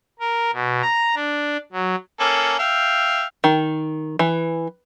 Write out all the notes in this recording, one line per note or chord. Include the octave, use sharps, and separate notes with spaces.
A#4
B2
A#5
D4
F#3
A#3 C#4 A4
E5 F5 G5
D#3
E3